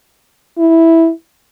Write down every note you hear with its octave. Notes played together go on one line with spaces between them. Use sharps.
E4